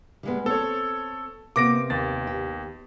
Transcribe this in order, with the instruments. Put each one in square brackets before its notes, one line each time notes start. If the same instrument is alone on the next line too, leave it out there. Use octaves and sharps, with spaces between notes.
[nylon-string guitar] G3 G#3 B3
[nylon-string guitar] C4 [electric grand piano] A4 C#5
[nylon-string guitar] C3 A#3 B3 [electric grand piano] D6 A#6 D7
[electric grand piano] D#2 A6
[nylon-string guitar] G4